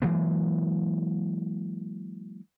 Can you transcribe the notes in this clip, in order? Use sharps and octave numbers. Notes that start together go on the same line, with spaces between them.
E3 F#3 G#3 A#3